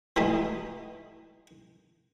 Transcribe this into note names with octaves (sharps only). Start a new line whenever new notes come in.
E3 F#3 G3 A3 D#4